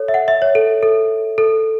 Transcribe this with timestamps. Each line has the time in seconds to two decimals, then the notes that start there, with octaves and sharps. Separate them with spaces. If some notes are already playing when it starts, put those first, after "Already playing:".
Already playing: A4 C#5
0.08 E5
0.14 F#5
0.28 E5
0.42 C#5
0.55 A4
0.83 A4
1.38 A4